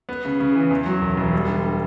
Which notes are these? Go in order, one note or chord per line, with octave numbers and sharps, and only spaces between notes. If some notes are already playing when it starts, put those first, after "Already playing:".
B3
C#3
C#3
E3
E2
F#3
E1
E1
G3
D3